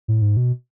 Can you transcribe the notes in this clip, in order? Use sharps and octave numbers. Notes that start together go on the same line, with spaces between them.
A2
G#2
B2